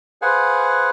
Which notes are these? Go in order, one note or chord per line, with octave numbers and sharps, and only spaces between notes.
G#4 B4 C5 F5 F#5 G#5